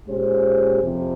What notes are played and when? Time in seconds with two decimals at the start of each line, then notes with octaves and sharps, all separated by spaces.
0.08 A#2 G#3 C#4 G4 C5
0.83 F2 C3